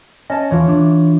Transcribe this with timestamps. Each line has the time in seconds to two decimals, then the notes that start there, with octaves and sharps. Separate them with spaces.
0.30 C#4 D#5 A5
0.51 E2 E3 F4 C#5
0.68 E3 D4